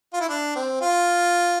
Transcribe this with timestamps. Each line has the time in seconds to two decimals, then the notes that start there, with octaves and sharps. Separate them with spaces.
0.13 F4
0.20 E4
0.29 D4
0.56 C4
0.81 F4